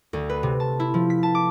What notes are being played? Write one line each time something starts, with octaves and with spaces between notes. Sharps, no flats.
D2
B4
C3
A5
E4
F3
B6
A5
D6